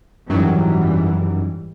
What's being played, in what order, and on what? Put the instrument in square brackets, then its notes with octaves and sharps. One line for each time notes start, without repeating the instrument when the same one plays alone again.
[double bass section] G#1 E3 G3 [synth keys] F#2 D#3 F#3